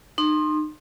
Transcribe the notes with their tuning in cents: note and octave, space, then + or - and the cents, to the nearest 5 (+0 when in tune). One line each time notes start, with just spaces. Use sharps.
D#4 -30 C6 +20